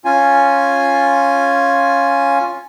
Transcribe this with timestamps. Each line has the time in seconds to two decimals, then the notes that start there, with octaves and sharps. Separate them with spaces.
0.05 C#4 F4 G#5